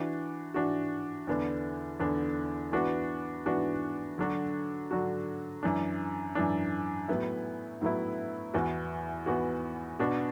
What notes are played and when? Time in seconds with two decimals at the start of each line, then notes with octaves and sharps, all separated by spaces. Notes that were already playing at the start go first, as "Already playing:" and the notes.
Already playing: E3 D4 F#4
0.54 E3 D4 F#4
1.27 E2 D3 B3 D4
2.00 E2 D3 B3 D4
2.72 E3 B3 D4 F#4
3.45 E3 B3 D4 F#4
4.18 D3 F#3 D4 F#4
4.91 D3 F#3 D4 F#4
5.63 F#2 E3 D4
6.35 F#2 E3 D4
7.08 A2 F#3 B3 E4
7.81 A2 F#3 B3 E4
8.54 E2 E3 B3 F#4
9.26 E2 E3 B3 F#4
9.99 B2 B3 D4 F#4